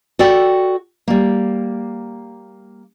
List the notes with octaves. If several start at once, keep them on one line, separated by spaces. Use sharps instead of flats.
F#4 A4 D5 G5
G3 A#3